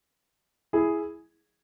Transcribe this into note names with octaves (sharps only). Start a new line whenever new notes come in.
E4 G#4